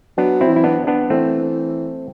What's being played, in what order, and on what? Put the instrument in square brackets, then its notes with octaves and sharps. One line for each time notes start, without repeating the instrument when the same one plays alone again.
[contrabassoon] F#3 [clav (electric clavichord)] B3 D4
[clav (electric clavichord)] C4 E4
[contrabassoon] E3
[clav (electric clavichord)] E4
B3 D4
B3 D4
[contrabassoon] E3 [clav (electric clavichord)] A3 C4